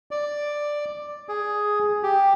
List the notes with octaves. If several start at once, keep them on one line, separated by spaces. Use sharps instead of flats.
D5
G#4
G4